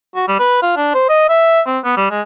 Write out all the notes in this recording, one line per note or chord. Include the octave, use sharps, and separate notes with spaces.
F#4
G3
B4
F4
D4
C5
D#5
E5
C4
B3
G3
G#3